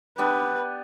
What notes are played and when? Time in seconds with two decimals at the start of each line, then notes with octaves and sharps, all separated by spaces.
0.18 B3 D4 G4 B4